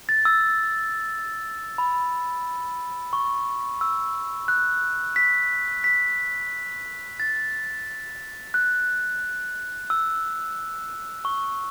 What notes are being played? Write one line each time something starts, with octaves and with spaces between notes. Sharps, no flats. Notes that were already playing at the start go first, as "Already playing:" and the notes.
A6
E6
B5
C#6
E6
F#6
B6
B6
A6
F#6
E6
C#6